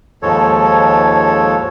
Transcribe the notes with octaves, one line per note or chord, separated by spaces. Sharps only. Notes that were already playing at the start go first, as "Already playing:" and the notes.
D#2 G#2 F3 G#3 A4 C#5